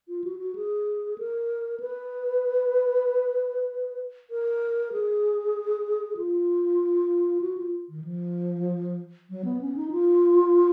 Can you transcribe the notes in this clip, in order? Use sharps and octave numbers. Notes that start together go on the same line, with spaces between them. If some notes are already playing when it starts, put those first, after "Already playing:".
F4
F#4
F#4
G#4
A#4
B4
A#4
G#4
F4
F#4
F4
D#3
F3
F#3
B3
C#4
D#4
F4